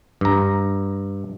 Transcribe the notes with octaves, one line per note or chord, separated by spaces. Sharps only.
G2 A#5